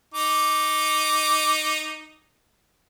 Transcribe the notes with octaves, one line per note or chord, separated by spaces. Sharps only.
D#4 D6